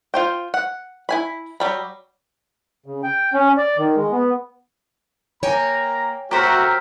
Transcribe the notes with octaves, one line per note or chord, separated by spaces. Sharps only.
F4 C5 G5
F#5
E4 G#5 B5
F#3 G3 B5
C#3
G5
C#4
D5
D#3
G#3
B3
A#3 C#5 G5 G#5 A#5
F#3 A3 F#4 G4 A#4 C5 E5